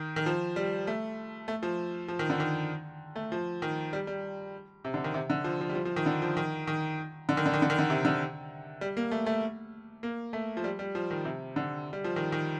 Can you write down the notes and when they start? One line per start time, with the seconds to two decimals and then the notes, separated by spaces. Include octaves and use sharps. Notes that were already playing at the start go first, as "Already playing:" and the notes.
Already playing: D#3
0.16 D#3
0.26 F3
0.56 G3
0.87 A3
1.48 A3
1.63 F3
2.08 F3
2.19 D#3
2.30 D3
2.40 D#3
3.16 A3
3.32 F3
3.62 D#3
3.93 G3
4.07 G3
4.84 C3
4.94 D3
5.04 D#3
5.14 C3
5.30 D3
5.44 F3
5.61 F3
5.69 G3
5.75 F3
5.85 F3
5.96 D#3
6.06 D3
6.22 F3
6.37 D#3
6.67 D#3
7.29 D3
7.37 D#3
7.46 D3
7.54 D#3
7.62 D3
7.70 D#3
7.79 D3
7.90 C3
8.05 D3
8.81 G3
8.97 A#3
9.11 A3
9.26 A3
10.03 A#3
10.33 A3
10.57 F3
10.64 G3
10.79 G3
10.95 F3
11.11 D#3
11.25 C3
11.56 D3
11.93 G3
12.04 F3
12.16 D#3
12.32 D#3